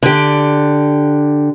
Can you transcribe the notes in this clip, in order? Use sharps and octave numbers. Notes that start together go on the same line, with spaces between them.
D3 G4